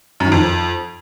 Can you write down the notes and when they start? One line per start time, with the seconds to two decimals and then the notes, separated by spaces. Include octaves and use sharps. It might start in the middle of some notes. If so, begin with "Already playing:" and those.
0.20 F#2
0.26 D#3
0.32 F2